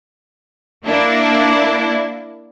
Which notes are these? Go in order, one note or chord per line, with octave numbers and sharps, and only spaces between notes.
A#3 D4 E4